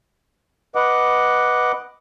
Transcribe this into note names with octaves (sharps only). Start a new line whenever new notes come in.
B4 D#5 F#5 D6